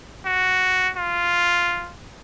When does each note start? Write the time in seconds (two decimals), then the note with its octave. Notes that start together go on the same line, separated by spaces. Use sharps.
0.26 F#4
0.97 F4